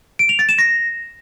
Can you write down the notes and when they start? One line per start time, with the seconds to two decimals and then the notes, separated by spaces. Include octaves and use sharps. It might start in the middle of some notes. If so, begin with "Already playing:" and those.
0.19 D7
0.29 F7
0.39 A6
0.49 E7
0.58 A#6